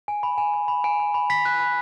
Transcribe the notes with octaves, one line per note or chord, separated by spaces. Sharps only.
G#5
B5
G#5
G#5
B5
G#5
B5
B5
B5 B6
F#6
B5